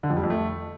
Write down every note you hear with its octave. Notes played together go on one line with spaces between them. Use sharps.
D3
F2
G3
F2
A3